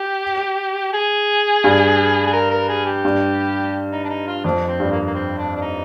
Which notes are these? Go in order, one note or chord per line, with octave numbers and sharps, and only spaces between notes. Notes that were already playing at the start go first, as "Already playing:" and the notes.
Already playing: G4
G#4
G2
G#4
A#4
A#4
G#4
G4
G2
D#4
D4
D#4
F4
F2 D4
C4
G2
A#3
A#3
C4
D4
D4
D#4